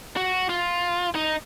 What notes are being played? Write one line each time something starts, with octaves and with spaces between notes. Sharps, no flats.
F#4
F4
D#4